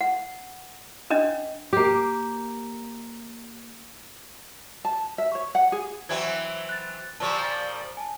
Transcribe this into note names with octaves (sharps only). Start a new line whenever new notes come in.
F#5
C#4 D4 D#5
A#3 G4
A5
E5
C#5
F#5
G#4
E3 F#3 C4 E5 G#6
F#6 A6
A#2 F3 G3 A5 C#6
G#5 A5